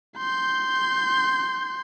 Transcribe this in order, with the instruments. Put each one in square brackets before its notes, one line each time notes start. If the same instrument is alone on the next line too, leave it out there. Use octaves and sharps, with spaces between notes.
[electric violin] C6 G6